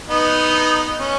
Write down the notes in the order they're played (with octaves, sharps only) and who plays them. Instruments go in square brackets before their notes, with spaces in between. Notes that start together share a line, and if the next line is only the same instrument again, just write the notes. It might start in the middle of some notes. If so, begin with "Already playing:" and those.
[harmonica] B3 D#4
C#4